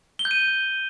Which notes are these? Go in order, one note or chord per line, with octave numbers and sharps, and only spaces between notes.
G7
G6
D#7